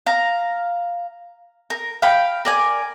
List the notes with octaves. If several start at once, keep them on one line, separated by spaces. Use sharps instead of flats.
F5 A#5
A#4
F5 G5 B5
A#4 D5 G#5